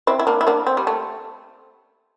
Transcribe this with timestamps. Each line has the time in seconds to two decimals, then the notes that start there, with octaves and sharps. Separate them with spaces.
0.07 C4 E4
0.19 E4
0.27 A#3 D4
0.41 E4
0.47 A#3 D4
0.67 C4
0.77 G3
0.87 A3